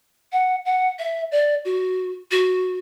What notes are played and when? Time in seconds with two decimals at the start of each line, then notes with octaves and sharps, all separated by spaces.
0.32 F#5
0.65 F#5
0.99 E5
1.32 D5
1.65 F#4
2.31 F#4